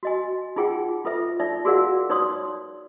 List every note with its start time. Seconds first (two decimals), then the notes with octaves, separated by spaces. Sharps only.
0.03 F#4 D#5 G#5
0.56 D#4 F4 G#4 F#5 G5
1.05 F4 A4 B4 E5
1.40 D#4 D5 E5
1.65 F#4 G#4 A#4 D5 F5 F#5
2.10 D#4 B4 C#5 D5 C6 D#6